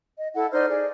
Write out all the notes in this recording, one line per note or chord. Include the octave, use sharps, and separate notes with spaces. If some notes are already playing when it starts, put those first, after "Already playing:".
D#5
E4 A4 F#5
D#4 C5 D5 F6
G#4 D5